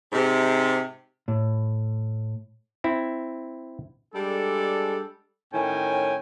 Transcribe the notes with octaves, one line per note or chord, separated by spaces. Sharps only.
G#2 C3
A2
C4 E4
G3 G#3 D4 A4
A2 D#3 C#4 E4 G5 G#5